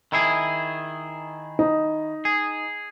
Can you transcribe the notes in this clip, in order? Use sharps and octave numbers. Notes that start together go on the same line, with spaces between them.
D#3 E4 G#4
D#4
G#4